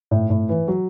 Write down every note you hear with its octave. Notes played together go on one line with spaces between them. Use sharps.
A2
A2
E3
F#3